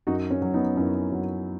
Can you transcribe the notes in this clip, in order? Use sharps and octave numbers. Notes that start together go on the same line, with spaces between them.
F#2 D#4 F#4
C#4
F#3
B3 D#4
F#2 C#4 E4
F#3